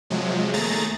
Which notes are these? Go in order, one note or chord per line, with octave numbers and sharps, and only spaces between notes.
C3 F3 F#3 G#3
D#2 A3 G#4 A#5 A6